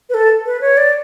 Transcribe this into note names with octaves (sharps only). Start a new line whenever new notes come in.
B4
A4
B4
C#5
D5